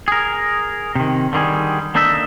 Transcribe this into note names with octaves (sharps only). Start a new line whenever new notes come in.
G#4 A#4
C3 D#3
D3 D#3 G3 G#4
A#3 D4 D#4 A4 E5